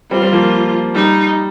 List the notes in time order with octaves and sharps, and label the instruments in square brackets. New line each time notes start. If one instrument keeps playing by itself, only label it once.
[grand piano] G3 C4 [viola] F4
[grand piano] G3 C4
F3 A#3
[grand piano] G3 [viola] D#4